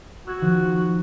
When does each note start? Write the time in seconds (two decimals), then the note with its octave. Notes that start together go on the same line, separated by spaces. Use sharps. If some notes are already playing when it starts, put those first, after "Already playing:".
0.27 F#4 E6 F#6 G#6
0.41 D#3 F3